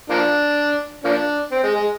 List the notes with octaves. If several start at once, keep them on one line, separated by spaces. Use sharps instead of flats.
F3 A#3 D4
F3 A#3 D4
C4
G#3
G#3